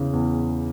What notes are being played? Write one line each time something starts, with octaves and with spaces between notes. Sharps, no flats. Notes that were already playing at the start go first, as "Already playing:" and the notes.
Already playing: E2 C#3
E2